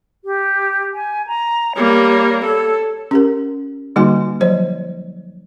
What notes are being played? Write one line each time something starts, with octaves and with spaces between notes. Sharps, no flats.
G4
G#5
A#5
G3 A#3 C#5
A4
C#4 G4 A#4
D3 G3 A#3 D#4 F#4 G#5
F3 F#3 C5 C#5